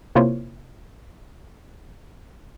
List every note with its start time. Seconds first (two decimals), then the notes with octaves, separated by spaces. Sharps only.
0.15 C3 A#3 E4 F4 C5 C#5